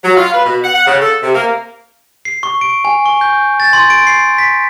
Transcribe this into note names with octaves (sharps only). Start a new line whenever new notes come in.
F#3
F4
B4
B2
F#5
F#5
C#3
A4
C3
A#3
C7
C#6
D7
G#5
C#6
G6
A6
C6
D7
C7
B6